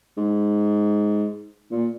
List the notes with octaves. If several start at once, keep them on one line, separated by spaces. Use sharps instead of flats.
G#2
A#2